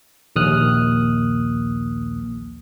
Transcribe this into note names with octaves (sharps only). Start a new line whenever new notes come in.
A#1 D#2 D#6 F6 F#6